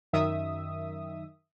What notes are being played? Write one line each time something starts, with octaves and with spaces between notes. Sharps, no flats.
F#2 D#3 E5 D#6